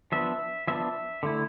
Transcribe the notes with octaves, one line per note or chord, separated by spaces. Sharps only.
F3 B3 D4 E5
F3 B3 D4 E5
D3 A3 E4